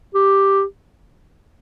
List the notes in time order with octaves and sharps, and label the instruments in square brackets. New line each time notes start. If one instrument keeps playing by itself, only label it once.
[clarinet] G4